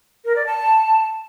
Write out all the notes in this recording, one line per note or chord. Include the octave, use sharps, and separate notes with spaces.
A#4
D5
A5